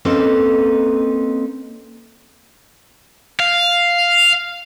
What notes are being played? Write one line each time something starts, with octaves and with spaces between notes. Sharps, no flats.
A#3 C4 C#4 D#4 A4 B4
F5